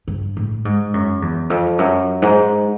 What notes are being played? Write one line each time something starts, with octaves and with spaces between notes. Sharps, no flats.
G2
A2
G#2
F#2
E2
F2
F#2
G#2